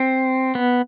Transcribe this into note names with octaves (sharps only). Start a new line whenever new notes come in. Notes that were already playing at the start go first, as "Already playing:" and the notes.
Already playing: C4
B3